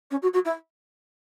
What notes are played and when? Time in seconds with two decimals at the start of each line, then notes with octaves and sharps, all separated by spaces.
0.11 C#4
0.22 F#4
0.33 F#4
0.45 E4